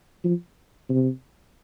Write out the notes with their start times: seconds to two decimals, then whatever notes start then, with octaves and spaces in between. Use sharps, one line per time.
0.24 F3
0.89 C3